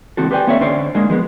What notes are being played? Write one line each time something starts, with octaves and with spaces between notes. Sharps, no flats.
C#2 E3 C4 F#4 A4
G4 B4 C5 D5 G5 G#5
A#3 C4 A4 C#5 D5 E5
D3 C#4 C5 D5
G#3 A#3 D4 G#4
F3 G#3 B3